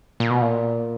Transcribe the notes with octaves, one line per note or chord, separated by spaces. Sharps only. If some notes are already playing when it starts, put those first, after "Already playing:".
A#2
B2
A#2